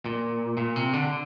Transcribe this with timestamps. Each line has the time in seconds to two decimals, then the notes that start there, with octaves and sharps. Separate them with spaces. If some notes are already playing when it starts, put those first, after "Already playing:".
0.05 A#2
0.57 A#2
0.76 C3
0.93 D3